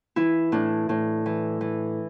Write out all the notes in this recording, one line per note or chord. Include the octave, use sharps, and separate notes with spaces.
E3 E4
A2 D4
A2
E3
E3